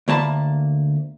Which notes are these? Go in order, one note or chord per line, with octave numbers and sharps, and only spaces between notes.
D2 A#3 A5 B5